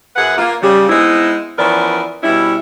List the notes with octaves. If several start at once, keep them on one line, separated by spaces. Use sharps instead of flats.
F#2 G#4 B4 F#5
A#3 F4
C#3 G3
G#3 B3 C4 D#4 E4
E3 F3 B3 C#4 A#4 D5
B2 G3 C#4 E4